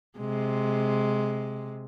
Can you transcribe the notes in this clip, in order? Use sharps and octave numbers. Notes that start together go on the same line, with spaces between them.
C3 G#3